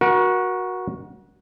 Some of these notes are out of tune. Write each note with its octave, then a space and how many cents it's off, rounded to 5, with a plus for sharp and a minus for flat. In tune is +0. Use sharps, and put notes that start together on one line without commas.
F#4 -10 A#4 +35